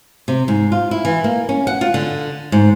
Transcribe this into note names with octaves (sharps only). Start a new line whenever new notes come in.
C3
G#2
F4
E4
E3
A#3
C#4
F#5
F4
D3
G#2